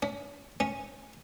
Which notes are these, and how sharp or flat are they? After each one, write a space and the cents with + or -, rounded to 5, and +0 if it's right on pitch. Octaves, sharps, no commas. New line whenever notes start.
C#4 +35
C#4 -5